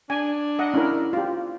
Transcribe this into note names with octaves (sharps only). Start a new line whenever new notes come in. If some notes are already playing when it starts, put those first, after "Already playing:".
D4 G#5
D#5 F#5
C#4 E4 A#4
F4 G4